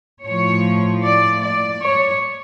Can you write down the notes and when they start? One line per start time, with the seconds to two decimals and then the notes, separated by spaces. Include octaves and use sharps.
0.23 A2 F3 C#5
1.04 D5
1.43 D5
1.83 C#5